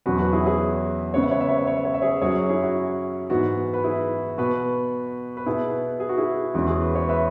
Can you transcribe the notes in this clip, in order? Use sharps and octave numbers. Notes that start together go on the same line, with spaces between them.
E2 B2 F#3 C#4 F#4 B4
F#4 B4
E4 G#4
G#4 C#5
C#3 G#3 B3 C#5
E5
C#5
E5
C#5
E5
C#5
E5
C#5
E5
G#4 C#5
F#2 F#3 C#4 G#4 C#5
E4 G#4
F#4
G#2 E3 B3 F#4
B4
E4 G#4
B2 B3 F#4 B4
B4
B2 B3 E4 G#4
G#4
F#4
E4 G#4
E2 E3 G#3 C#4 F#4
G#4
B4
C#5
B4 E5